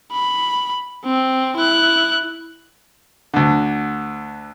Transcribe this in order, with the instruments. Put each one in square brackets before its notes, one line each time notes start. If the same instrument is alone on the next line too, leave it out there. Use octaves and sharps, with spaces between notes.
[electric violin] B5
C4
E4 F#6
[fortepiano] D2 D3